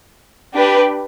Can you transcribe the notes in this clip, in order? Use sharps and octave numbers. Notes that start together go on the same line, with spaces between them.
D4 G4 B4